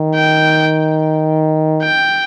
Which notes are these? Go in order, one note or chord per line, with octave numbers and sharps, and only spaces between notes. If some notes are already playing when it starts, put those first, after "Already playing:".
Already playing: D#3
G5
G5